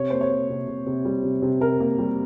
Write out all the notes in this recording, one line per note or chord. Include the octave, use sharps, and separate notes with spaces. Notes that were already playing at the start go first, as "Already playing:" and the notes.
Already playing: C3 C#5
A#3 C5
C#5
A#3
C3
C3
C3
G3
C3
C3
C3 A#4
A#3
G3